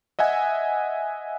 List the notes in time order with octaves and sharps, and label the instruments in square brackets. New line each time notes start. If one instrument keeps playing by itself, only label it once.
[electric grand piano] D#5 E5 F#5 G#5